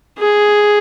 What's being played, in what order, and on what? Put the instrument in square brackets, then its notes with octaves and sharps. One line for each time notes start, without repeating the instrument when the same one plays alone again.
[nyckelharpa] G#4